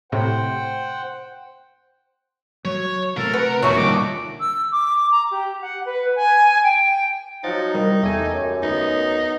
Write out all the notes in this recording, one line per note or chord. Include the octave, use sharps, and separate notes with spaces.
A2 C3 C5 F#5 G5
F#3 C#5
C3 A3 C4 A4 A#4
B4 F#5
B1 E2 A#2 D#3 A3 F#4 C#5
D3 G3 D4 D6
E6
D6
A#5
G4
F#5
B4
G#5
G5
F3 F#3 D#4 F#5 A6
C2 D#3 G3
E2 A3 G4 G#5
F#2
D2 B3 D#4